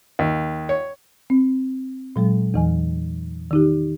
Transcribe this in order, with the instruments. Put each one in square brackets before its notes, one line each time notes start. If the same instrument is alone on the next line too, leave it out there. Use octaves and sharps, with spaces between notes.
[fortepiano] D#2
C#5
[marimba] C4
A#2 F#3 G#3
E2 E3 G#5
D#3 D#4 G4